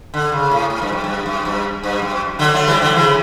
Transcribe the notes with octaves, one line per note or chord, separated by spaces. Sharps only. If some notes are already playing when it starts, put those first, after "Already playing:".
D3
C#3
A2
A2
G2
F#2
G2
F#2
G2
G2
F#2
D3 F#3
F#3 A3
E3 G3
D3 F#3
C#3 E3